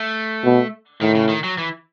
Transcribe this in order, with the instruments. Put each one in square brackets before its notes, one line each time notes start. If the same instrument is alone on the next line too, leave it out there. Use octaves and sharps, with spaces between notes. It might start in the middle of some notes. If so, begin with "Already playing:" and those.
Already playing: [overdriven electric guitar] A3
[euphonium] B2
[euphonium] A2 [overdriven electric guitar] D#3
[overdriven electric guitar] C#3
D#3
F#3
E3